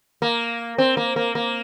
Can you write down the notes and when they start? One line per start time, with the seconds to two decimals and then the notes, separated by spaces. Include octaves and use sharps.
0.22 A#3
0.78 C4
0.97 A#3
1.16 A#3
1.35 A#3